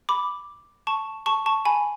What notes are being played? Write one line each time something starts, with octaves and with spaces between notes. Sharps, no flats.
B5 D6
A5 C#6
A5 C#6
A5 C#6
G#5 B5